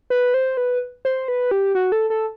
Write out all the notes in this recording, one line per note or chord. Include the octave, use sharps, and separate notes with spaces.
B4
C5
B4
C5
B4
G4
F#4
A4
A4